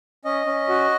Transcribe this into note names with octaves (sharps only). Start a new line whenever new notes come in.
C#4 D#5
C#4
F#4